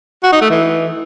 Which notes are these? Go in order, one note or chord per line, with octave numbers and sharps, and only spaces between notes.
F#4
D#4
A3
E3